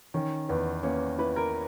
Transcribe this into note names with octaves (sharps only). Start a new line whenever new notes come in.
D#3 C#4
E2 B3
A#3 C#4
E4 B4
A#4